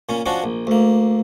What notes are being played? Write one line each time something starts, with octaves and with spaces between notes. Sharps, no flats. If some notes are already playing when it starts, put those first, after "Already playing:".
A#2 C#4
F3 C#4 D4 F#4
A#1
D2 A#3